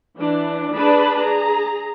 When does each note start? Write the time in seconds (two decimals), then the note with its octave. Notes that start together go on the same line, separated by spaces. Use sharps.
0.18 E3 D4
0.75 D4 G#4 B4 A5 B5
1.20 G#4 A#5